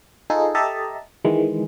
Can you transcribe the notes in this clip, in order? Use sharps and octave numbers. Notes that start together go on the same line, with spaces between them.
D#4 F4 G#4 A4
G4 A4 D#5 E5 A5 A#5
D#3 E3 G#3